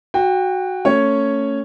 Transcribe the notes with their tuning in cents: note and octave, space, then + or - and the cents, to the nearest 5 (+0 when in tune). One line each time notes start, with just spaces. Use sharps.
F#4 +0 G5 +25
A3 +25 C#4 +0 C#5 +0